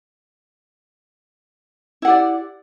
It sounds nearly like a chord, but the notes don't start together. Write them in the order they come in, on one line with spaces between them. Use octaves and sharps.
E4 F#5 G4 D5